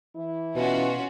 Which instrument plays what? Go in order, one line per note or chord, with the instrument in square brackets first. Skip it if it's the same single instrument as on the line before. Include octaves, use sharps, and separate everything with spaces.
[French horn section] E3 E4
[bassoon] B2 [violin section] C#4 F4 F#4